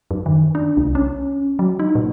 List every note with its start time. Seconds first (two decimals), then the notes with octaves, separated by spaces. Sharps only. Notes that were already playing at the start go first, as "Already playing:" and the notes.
0.11 F#2
0.26 D#3
0.55 D4
0.77 C2
0.95 C#4
1.59 F#3
1.79 D#4
1.95 A#2